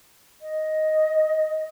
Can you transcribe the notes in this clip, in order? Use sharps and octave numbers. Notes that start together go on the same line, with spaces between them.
D#5